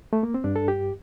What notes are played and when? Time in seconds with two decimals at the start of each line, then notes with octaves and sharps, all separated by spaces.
0.13 A3
0.23 A#3
0.34 C4
0.44 G2 D4
0.56 A4
0.68 G4